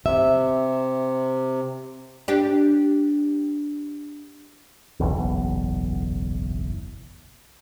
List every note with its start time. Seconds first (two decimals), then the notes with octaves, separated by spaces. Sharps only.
0.06 C3 E5
2.28 D4 G4
5.00 F#1 B1 E2